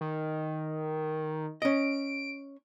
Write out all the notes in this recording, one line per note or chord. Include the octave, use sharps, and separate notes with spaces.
D#3
C#4 D#5 D7